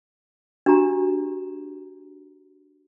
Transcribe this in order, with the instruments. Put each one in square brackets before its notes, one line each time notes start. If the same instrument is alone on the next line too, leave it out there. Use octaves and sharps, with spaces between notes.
[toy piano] D4 F#4 G4 A#5